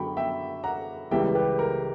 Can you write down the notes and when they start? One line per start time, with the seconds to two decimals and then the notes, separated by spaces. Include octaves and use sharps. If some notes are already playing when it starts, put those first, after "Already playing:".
Already playing: F#2 D3 F#3 G5 B5 C#6
0.17 E5 G5
0.64 F#5 A#5
1.11 C#2 C#3 E3 G3 E5 G5
1.35 G4 B4
1.59 A#4